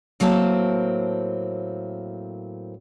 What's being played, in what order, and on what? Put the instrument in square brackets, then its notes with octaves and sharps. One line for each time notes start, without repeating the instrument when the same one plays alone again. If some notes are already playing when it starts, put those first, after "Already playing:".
[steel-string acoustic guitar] A2 F#3 A#3 C4 A5